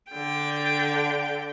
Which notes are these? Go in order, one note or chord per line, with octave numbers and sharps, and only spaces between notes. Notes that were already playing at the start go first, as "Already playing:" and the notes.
D3 G5